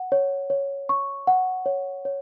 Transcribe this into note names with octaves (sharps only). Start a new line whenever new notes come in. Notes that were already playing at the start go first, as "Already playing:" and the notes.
Already playing: F#5
C#5
C#5
C#6
F#5
C#5
C#5